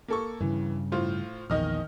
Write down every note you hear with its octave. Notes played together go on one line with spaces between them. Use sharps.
A#3 A4 C#6
G2 C#3 E3
A2 F4 C5
A#1 E2 D#3 D#5 F6